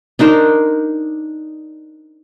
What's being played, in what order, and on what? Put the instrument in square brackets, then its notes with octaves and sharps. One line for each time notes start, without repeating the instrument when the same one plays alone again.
[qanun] D4 D#4 A#4 C5